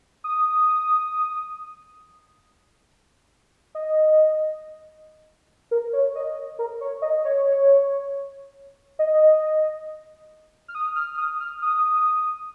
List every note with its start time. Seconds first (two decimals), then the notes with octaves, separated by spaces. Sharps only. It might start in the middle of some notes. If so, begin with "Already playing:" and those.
0.24 D#6
3.75 D#5
5.71 A#4
5.93 C#5
6.15 D#5
6.59 A#4
6.81 C#5
7.02 D#5
7.25 C#5
8.99 D#5
10.68 F6
10.75 D#6
10.96 F6
11.18 D#6
11.40 F6
11.62 D#6